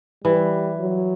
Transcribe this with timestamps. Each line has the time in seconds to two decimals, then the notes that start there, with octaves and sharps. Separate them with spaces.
0.24 E3 G3
0.80 F#3